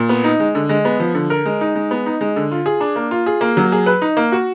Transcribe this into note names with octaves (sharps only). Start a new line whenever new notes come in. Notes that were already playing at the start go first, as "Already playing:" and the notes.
Already playing: A#2
B3
D#4
G#3
D3
G#3
B3
F3
D3
A#4
G#3
D#4
G#3
B3
D#4
G#3
D3
F4
G#4
D4
A#3
F4
G#4
A#3
F#3
G#4
B4
D#4
A#3
F#4